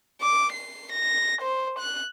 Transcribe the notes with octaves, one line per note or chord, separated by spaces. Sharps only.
D6
C7
A#6
C5
F#6